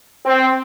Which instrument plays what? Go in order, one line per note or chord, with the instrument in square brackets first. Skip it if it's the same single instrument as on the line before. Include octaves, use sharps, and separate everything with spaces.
[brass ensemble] C4